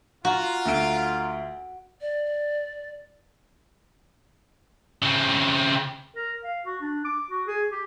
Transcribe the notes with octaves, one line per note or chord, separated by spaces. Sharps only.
F4 F#4 A#5
D2 D7
D5
C#3 C4
A#4
F5
F#4
D4
D6
F#4
G#4
G4